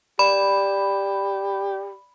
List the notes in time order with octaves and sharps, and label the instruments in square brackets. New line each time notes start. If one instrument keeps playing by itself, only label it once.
[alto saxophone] G4 [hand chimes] D5 [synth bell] B5